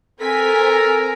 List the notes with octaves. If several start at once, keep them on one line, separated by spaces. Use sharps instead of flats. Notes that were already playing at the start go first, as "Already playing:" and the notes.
C4 A4 A#4 G#5 B6